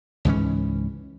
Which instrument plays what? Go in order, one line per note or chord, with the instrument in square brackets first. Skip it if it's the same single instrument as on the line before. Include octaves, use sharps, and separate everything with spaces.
[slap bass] C#2 G#2 E3 C#4